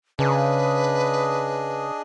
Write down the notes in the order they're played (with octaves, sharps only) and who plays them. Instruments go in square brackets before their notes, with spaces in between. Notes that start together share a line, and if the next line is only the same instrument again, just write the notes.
[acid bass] C#3 [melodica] D4 G#4 D#5 [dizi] B4